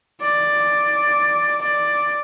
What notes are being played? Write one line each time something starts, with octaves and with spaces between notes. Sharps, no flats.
D5
D5